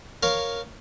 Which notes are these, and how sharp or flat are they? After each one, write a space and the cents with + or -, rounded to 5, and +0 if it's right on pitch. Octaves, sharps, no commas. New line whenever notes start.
A#4 +0 C#5 +0 F5 +0